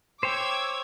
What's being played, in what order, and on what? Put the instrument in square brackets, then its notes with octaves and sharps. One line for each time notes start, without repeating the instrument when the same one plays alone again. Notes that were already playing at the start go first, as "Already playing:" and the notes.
[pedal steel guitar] C5 C#5 G5 [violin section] D6 E6 G#6